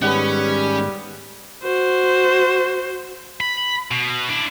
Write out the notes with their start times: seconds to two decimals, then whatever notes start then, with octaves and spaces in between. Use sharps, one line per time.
0.02 G#2 D#3 G3 G#3 B3 C#4 F#5
1.63 F#4 C5
3.41 B5
3.91 B2
4.29 D4 E4